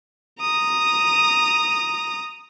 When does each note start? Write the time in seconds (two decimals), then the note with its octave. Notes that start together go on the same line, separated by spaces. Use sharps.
0.40 A#5 D#6